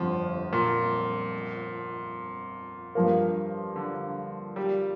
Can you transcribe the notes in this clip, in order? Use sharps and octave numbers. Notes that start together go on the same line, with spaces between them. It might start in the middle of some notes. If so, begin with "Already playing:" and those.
Already playing: G1 F2 D3 F3
A#2
G2 F3 A#3
D3
G3